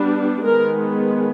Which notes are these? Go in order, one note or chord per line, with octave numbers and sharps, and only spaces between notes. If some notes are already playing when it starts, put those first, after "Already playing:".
Already playing: G3 B3 D4
D#3 G#3 B3 A#4